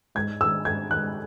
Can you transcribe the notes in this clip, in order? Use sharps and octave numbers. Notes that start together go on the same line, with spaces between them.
G#2 G#6
D#3 G#3 E6
G#2 G#6
D#3 G#3 F#6